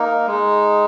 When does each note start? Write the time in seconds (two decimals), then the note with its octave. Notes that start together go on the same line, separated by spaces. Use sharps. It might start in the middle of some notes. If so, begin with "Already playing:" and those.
Already playing: A#3 D#4
0.27 G#3 D#4